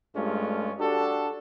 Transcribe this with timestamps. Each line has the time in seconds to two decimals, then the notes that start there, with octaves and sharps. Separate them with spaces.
0.15 G2 G#3 A3 C#4 F4
0.79 D4 F#4 G4 A4